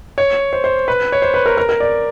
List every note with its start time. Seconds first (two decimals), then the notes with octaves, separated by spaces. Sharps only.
0.18 C#5
0.53 C5
0.64 C5
0.88 B4
1.12 C#5
1.22 C5
1.34 B4
1.46 A#4
1.58 A#4
1.69 A#4
1.80 D5